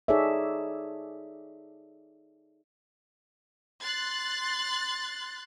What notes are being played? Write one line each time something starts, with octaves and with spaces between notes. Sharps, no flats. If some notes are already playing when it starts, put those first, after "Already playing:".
D#4 G#4 A4 C#5 D5 E5
C6 F#6 A6